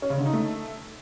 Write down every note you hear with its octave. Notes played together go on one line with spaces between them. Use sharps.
C#4
C#3
D3
D#4
A3